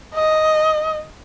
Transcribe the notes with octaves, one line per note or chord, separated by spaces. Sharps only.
D#5